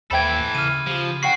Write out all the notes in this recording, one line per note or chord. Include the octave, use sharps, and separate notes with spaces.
D#2 E3 A4 C5 E5 G5 B5 G#6
C#3 F6 D#7
F3 G4
C#4 F#4 F#5 G5 C7